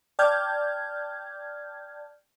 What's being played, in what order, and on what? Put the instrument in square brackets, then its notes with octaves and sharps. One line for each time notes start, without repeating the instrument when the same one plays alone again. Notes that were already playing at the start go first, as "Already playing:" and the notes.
[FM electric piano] D5 G5 A5 F6 G6 G#6